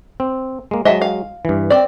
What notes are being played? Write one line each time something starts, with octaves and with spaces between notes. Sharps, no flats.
C4
G#3 A#3
F#3 G#3 D#5 E5 A5
F5
G2 E3
C4 D5